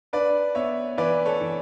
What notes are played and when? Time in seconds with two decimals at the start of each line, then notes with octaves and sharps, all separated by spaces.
0.13 D4 B4 D5
0.55 B3 C#5 E5
0.98 E3 B4 D5
1.26 A4 C#5
1.41 E3